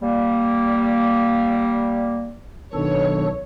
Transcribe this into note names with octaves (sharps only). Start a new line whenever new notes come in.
G3 A#3
B1 D#3 D4 A4 C#5